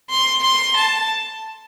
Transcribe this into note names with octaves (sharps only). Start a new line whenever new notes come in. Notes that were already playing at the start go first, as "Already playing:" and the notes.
C6
C6
A5